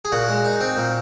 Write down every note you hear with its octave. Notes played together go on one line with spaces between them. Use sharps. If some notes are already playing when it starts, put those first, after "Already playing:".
G#4
A#2 F#4
G#3
D#4
C4
A#2